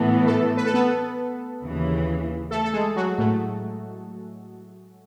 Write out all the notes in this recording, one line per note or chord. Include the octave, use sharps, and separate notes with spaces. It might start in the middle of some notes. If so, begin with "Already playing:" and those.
Already playing: A2 E3 A3 B3 A4
A3 A4
B4
A4
B3 B4
D#2 C#3 E3
A3 A4
A4
G#3 G#4
F#3 F#4
A2 A3